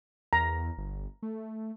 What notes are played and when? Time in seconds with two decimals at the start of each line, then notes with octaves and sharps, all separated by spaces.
0.33 E2 A#5
0.78 G1
1.23 A3